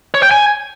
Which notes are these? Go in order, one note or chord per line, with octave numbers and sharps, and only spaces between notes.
C#5
G5
G#5